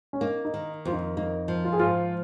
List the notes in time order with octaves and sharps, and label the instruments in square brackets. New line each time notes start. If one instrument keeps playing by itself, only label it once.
[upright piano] C#4
[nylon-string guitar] A#3 [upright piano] D#4
[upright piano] D#4
[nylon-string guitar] D#3
[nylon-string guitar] F2 [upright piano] F4
[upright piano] D#4
[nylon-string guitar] A#3 [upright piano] D#4
[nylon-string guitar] F3
[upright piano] F4
G#4
[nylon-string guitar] G#2 [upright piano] F4